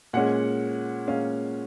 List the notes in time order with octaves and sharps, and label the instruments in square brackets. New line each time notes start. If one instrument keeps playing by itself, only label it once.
[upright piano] A#2 G#3 C#4 F#5
A#2 G#3 C#4 F5